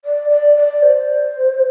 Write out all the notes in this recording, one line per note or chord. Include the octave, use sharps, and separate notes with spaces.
D5
D5
D5
C5